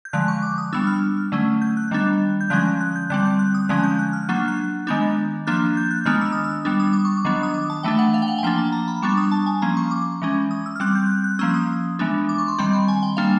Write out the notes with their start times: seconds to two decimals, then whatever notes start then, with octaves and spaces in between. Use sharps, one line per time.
0.05 G6
0.13 D3 F3 G#3 F#6
0.28 C#6
0.42 D6
0.58 D#6
0.73 G3 B3 D4 E6
0.87 F6
1.32 D3 F#3 A3 C#4
1.62 G6
1.77 F#6
1.91 D#3 G3 B3 D4
2.41 G6
2.50 D3 F3 G#3 C#4 F#6
2.65 F#6
2.81 F#6
2.96 G6
3.10 D3 G3 C4 F#6
3.25 G6
3.39 F#6
3.54 D#6
3.69 D3 F3 G#3 C#4 F#6
3.83 G6
3.99 F#6
4.13 F6
4.29 F#3 A#3 D4 F#6
4.48 F#6
4.87 D#3 G#3 B3 D4 G6
5.47 F3 A#3 D4 F#6
5.77 G6
5.91 F#6
6.06 D#3 G#3 B3 D4 F6
6.21 E6
6.32 D#6
6.44 E6
6.65 G3 B3 D4
6.80 D#6
6.93 D6
7.05 C#6
7.17 D6
7.25 D#3 F#3 B3 D4
7.43 D#6
7.54 D6
7.70 A5
7.83 E3 A3 D4 G5
7.99 F#5
8.14 F5
8.22 G5
8.28 F#5
8.38 G#5
8.43 F3 A#3 D4 G5
8.58 A5
8.72 A#5
8.88 B5
9.02 G3 B3 D4 C#6
9.17 D#6
9.31 A5
9.46 G#5
9.62 F3 A#3 C#4 A#5
9.77 C#6
9.91 D6
10.22 E3 G#3 C#4
10.51 D#6
10.66 E6
10.76 F6
10.80 G3 C4 F#6
10.95 G6
11.06 F#6
11.10 G6
11.24 F#6
11.39 F3 A#3 C#4 E6
11.54 D#6
11.99 E3 G#3 B3 D4
12.29 D6
12.38 C#6
12.48 C6
12.59 D#3 G3 C4 B5
12.73 C6
12.88 G#5
13.03 G5
13.17 G3 A#3 D4 F5